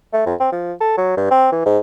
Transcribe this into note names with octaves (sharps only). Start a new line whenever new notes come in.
A3
F2
C4
F3
A4
F#3
G2
C4
E3
G#2